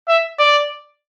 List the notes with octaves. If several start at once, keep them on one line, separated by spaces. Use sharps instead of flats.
E5
D5